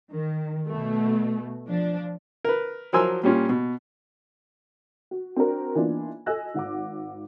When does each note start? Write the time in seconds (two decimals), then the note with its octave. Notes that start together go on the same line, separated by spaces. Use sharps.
0.11 D#3
0.67 B2 A3
1.67 F3 D4
2.45 A#4 B4
2.93 F3 F#3 A#4 G#5 C6 E6
3.23 A#2 G3 C#4 F4
3.49 B2
5.11 F#4
5.36 C4 D4 F#4 A#4
5.75 E3 A#3 B3 D4 D#4 F4
6.26 A4 D#5 G#5 E6 F#6 A#6
6.54 G#1 F#5 D6